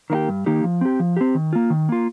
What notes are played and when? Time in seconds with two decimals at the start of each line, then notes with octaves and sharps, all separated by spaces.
0.10 D#3 A#3 D#4 G4
0.29 G2
0.46 D#3 A#3 D#4 G4
0.64 F3
0.81 C4 G4
1.00 F3
1.17 C4 G4
1.35 D#3
1.53 A#3 F4
1.70 D#3
1.89 A#3 F4